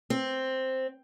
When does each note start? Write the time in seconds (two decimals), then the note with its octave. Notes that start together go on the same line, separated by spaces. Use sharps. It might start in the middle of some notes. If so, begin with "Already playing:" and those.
0.10 C4